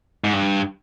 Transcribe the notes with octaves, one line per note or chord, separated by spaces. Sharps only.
G#2
G2